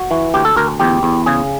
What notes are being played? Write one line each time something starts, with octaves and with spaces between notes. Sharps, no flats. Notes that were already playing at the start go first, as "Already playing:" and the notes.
Already playing: F#4
E3
D2 G4
A4
D2 A#4
E2 G4
E2
C#3 G#4